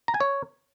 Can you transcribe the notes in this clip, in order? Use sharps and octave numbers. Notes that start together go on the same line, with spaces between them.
A#5
G#5
C#5